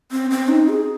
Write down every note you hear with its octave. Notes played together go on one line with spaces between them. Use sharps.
C4
C4
D#4
G#4